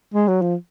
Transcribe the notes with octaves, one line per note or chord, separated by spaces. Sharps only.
G#3
F#3
F3